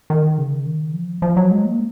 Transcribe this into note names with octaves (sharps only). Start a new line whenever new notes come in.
D#3
C#3
D#3
F3
F3
F#3
G#3
A#3